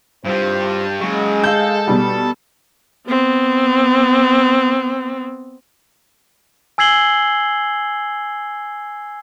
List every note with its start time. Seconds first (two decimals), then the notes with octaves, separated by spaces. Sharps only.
0.25 C2 G2 G3 F4 C5
1.00 C#3 F#3 G#3
1.44 A4 F5 G6
1.87 B2 G3
3.06 B3 C4
6.78 G#5 E6 G#6 C7 F#7 G7